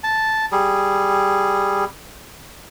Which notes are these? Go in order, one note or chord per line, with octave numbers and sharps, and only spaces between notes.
A5
G3 G#4